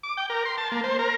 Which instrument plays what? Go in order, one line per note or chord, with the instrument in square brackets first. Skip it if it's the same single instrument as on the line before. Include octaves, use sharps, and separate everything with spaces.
[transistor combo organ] D6
G5
A#4
C6
A5
A#3
C5
A#4